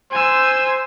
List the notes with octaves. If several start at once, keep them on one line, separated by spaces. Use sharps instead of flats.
C5 G#5 E6